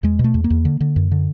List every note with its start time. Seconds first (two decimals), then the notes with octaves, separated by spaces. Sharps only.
0.03 E2 G#3
0.19 B2
0.24 A3
0.34 E2
0.44 A#3
0.50 E2
0.65 D3
0.80 D3
0.96 F#2
1.12 D3